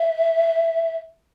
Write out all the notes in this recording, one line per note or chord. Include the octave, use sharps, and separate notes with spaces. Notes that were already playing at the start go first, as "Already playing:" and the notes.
Already playing: E5